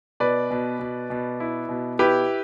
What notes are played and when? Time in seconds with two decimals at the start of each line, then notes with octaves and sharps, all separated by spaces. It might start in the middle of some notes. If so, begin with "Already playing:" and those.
0.20 B2 B4 D5
0.51 B2
0.79 B2
1.10 B2
1.40 E4
1.69 B2
1.99 E4 G4 B4